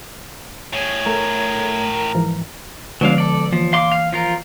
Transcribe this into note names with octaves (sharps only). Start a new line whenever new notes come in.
A2 G#4 C#5
A3 A#4
G#2 E3 F3
D3 F3 F#3 D4 F5
A4 D5
E3 F3
F5 C6 D6
F5
F3 F4 A#4